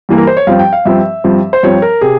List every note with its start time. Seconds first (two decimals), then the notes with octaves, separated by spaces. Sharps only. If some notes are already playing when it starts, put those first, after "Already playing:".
0.09 G2 E3 A#3
0.18 A#4
0.27 C5
0.37 C#5
0.47 G2 F3 C4 F5
0.59 G5
0.73 F5
0.85 G2 F3 C4 E5
1.24 G2 F3 C4
1.53 C5
1.63 G2 F3 C4 C#5
1.82 A#4
2.01 C3 G#4